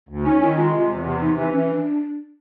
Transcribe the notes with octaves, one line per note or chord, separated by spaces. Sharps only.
D2
C#4 D#4
D#3 E4
G#3 F4
C3 F4
E2
C3
E3 D#4
E3 D#4
E3 C#4
D4